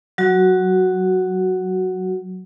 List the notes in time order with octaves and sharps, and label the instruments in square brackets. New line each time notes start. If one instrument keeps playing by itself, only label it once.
[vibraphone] F#3 F#4